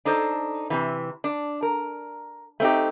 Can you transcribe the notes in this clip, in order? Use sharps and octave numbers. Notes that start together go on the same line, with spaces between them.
D4 D#4 A4 C5
C3 E3
D4
A#4
A3 C4 D#4 G4